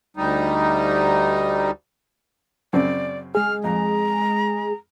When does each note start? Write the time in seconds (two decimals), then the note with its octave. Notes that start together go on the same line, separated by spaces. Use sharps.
0.17 D2 G3 D#4
2.73 F#2 C#3 C4 D5
3.35 G#3 G#4 F6
3.64 F2 A#5